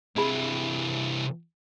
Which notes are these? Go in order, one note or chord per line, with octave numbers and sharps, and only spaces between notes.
C3 E3 E4 G#4 B5